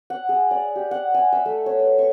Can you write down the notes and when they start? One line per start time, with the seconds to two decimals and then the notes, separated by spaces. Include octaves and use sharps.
0.10 F#5
0.29 G#4
0.51 D5
0.76 G4
0.91 F#5
1.14 G#5
1.33 E5
1.46 A3
1.66 C#5
1.79 B4
1.99 C#6